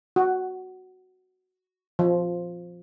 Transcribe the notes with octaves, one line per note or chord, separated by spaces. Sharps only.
F#4
F3